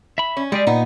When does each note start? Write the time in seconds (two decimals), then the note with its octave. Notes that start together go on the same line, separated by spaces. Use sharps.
0.18 E5 B5
0.37 C#4
0.52 G3 G#3 G4 G#4
0.67 A#2 B3 D#4